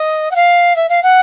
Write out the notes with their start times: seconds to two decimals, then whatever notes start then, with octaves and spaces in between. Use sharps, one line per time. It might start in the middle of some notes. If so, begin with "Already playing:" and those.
Already playing: D#5
0.31 F#5
0.35 F5
0.76 E5
0.89 F5
1.03 F#5